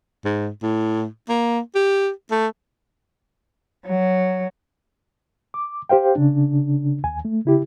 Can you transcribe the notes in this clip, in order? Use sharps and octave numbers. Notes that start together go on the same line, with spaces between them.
G#2
A2
A#3
G4
A3
F#3
D6
G4 C5 F5 G5
C#3 D4
D#2 G#5
A3
C#3 E4 G4